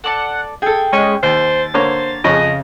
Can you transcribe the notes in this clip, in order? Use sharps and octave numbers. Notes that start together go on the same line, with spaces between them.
A4 D5 F#5 A5
G#4 A4 G5 G#6
G#3 C#4
D#2 C5 A6
D3 A#3 C5 C#5
F2 C#3 D#5 G#5 B5 C#6